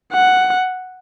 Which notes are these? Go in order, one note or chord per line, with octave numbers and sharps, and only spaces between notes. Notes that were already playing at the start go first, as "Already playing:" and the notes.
F#5